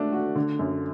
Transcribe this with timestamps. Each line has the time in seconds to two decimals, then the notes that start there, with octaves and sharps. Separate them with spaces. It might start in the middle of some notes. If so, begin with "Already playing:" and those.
Already playing: A3 D4 F#4
0.13 F#4
0.35 D3
0.59 F#2